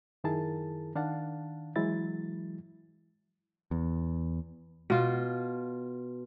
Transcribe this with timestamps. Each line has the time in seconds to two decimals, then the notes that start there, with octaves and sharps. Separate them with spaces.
0.24 F#2 D#3 E4 G#4 A#4 A5
0.95 D#3 D4 F5 F#5 A5
1.76 E3 F#3 G#3 E4 A6
3.71 E2
4.90 B2 F4